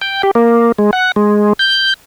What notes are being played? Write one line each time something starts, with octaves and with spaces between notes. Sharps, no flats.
G5
G4
A#3
G#3
F#5
G#3
G6